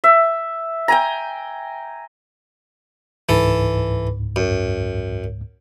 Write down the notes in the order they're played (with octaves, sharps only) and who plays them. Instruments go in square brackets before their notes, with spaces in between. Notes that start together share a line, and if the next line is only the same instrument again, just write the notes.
[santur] E5
G5 G#5 A#5
[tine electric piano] C#2 G#2 [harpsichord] E3 A4
[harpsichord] F#2